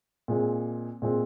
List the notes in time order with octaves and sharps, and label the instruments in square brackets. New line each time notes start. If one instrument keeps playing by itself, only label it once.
[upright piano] A#2 G#3 C4
A#2 G#3 C4